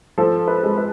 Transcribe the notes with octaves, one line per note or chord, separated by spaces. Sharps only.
F3 A4
B4
G#3
B4